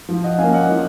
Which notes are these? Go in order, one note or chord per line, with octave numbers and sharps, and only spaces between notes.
F3
D#5 F#5
A#3 C#4 F5 G#5
D#5 F#5
F3